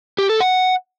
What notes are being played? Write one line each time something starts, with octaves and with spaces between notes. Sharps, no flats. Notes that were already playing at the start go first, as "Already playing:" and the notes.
G4
A4
F#5